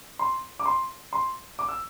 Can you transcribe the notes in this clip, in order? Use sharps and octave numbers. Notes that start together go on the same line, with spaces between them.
C6
D6
C6
C6
D6
E6